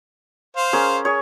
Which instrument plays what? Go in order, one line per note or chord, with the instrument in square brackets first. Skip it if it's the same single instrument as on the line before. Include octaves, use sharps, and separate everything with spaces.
[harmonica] C5 F5
[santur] C#4 G#4 A#4
G#4 C#5